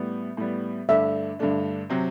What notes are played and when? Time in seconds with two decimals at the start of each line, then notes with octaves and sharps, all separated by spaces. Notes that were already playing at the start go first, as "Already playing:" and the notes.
Already playing: A2 G3 B3
0.37 A2 G3 B3
0.89 G2 D3 A3 D4 E5
1.39 G2 D3 A3 D4
1.90 C3 F#3 C4